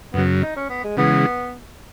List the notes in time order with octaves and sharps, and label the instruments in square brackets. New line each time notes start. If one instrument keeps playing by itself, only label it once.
[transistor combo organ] F#2 C#3 F#3 [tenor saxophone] B3
[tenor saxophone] D#4
C#4
B3
G#3
[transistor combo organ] C#3 E3 G#3 [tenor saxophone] B3